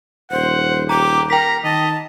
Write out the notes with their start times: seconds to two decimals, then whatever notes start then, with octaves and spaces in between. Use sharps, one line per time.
0.32 D#1 C5 F#5
0.89 G4 A#5 D6
1.30 A#4 G5 A#5 B6
1.64 D#3 D#5 A5